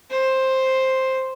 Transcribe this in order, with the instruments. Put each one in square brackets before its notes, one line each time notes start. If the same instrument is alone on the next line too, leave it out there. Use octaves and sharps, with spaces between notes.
[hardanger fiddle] C5